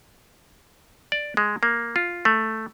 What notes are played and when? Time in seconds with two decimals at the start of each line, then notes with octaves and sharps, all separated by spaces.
1.12 D5
1.37 G#3
1.63 A#3
1.96 F4
2.25 A3